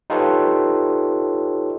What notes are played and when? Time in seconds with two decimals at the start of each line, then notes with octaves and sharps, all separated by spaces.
0.10 D#4 F4 G4 A4 B4 C#5